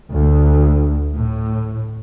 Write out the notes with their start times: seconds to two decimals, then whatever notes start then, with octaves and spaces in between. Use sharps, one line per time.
0.13 D2
1.16 A2